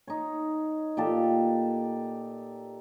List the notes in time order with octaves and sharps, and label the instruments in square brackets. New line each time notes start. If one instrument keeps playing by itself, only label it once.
[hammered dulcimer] D#4 C#5
A#2 G4 A4